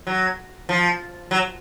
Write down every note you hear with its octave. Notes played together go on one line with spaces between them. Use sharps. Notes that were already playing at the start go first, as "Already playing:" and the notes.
F#3
F3
F#3